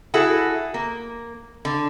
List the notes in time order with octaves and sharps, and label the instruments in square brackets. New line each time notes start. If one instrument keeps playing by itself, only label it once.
[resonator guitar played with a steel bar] E4 F#4 G#4 A4
A#3
D3